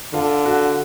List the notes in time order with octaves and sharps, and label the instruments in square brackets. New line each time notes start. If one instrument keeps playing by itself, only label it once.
[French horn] D3 [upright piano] F4
[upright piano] F#4